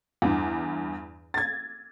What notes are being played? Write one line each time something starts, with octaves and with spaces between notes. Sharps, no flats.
E2 G2
G#6 A6